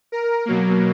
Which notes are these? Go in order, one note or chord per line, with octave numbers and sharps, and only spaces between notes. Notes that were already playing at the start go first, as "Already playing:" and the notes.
A#4
B2 F#3 A#3